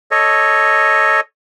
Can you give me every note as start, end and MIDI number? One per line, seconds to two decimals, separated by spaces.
0.11 1.20 69
0.11 1.20 73
0.11 1.20 75